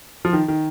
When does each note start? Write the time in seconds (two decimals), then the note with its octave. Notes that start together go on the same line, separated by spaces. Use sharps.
0.25 F3
0.33 D#3
0.48 D#3